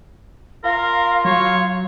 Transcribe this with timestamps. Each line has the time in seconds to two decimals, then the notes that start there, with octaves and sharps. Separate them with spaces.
0.64 F4 A#4 F5
1.25 F#3 C#5